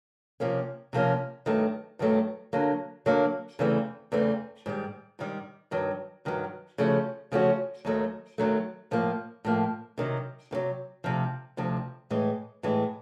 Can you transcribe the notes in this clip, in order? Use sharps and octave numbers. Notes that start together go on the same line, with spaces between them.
C3 F3 A#3 C#4
C3 F3 A#3 C#4
G2 D#3 F#3 A3
G2 D#3 F#3 A3
D3 F#3 A#3
D3 F#3 A#3
E2 C#3 E3 A3 C4
E2 C#3 E3 A3 C4
G#2 D#3 G3
G#2 D#3 G3
G2 D#3 F#3
G2 D#3 F#3
C#3 F3 A3 C#4 F#4
C#3 F3 A3 C#4 F#4
D#2 D#3 F#3 A3
D#2 D#3 F#3 A3
A2 F3 A#3
A2 F3 A#3
C3 D#3 F#3
C3 D#3 F#3
D2 C3 F3
D2 C3 F3
A2 E3 G#3
A2 E3 G#3